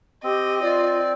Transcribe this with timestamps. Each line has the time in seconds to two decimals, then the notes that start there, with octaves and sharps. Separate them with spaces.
0.24 C4 G4 D#5
0.61 F4 D5